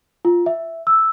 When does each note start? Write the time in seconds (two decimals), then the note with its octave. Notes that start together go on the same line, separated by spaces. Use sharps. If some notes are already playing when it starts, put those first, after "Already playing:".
0.25 F4
0.46 E5
0.87 E6